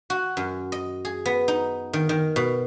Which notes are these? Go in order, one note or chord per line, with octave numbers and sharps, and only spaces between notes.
F#4
F#2
D#5
G#4
B3
D#4
D#3
D#3
B2